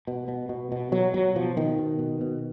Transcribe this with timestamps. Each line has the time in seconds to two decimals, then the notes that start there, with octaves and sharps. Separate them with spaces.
0.07 B2
0.28 B2
0.49 B2
0.72 B2
0.92 B2 F#3
1.14 B2 F#3
1.36 B2 F3
1.57 B2 D#3
1.79 B2
1.99 B2
2.21 B2